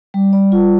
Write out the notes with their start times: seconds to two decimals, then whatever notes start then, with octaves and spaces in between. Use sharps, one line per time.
0.14 G3
0.33 D5
0.52 F4